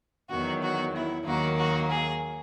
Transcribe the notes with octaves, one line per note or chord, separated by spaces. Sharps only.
E2 D#3 F#3 F#4
F#4
E4
D#2 D#3 F#3 A#3 F#4
F#4
G#4